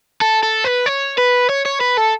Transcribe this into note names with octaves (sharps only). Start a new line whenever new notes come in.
A4
A4
B4
C#5
B4
C#5
C#5
B4
A4